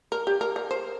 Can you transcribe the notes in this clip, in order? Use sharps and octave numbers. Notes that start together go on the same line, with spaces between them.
A#4
G4
A#4
A#4
C5